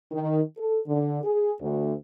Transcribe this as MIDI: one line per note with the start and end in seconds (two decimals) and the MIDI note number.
0.11 0.40 51
0.58 0.79 69
0.87 1.18 50
1.24 1.52 68
1.61 1.93 38